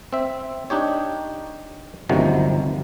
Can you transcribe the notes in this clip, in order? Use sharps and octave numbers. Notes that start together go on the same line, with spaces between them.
C4 E5
D4 D#4 G4 C#5
G1 D2 C3 D#3 F3 F#3